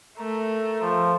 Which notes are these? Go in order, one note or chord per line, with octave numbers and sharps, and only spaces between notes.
A3 A#4
F3